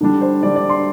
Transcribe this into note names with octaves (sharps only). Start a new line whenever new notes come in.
D3 G3 D4
C5
D3 G3 D4 D5
D5
C6